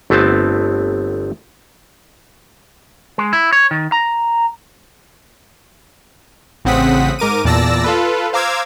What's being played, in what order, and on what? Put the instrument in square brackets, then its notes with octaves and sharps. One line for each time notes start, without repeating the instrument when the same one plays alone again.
[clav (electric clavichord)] G1 A3 B3 C4 A5
[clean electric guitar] G#3
E4
C#5
D#3
A#5
[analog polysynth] A1 C#3 C4 F#5 D#6 B6
G#2 A#4 D6 D#7
E2 A#2 D5 A5 E6 A#6
F4 A4 B4
C5 F5 A#5 D6 E6 G#6